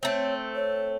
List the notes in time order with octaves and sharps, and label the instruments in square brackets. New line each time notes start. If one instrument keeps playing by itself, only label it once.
[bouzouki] A3 C4 [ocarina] C#5
[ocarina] C#5